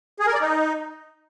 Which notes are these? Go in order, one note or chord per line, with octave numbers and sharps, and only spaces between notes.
G#4
A#4
D5
D#4